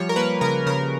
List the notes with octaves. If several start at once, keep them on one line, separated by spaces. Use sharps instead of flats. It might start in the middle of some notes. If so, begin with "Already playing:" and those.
Already playing: F3 G3 C#5
A#4
A#3 B4
C#3 A#4
C#3 A#4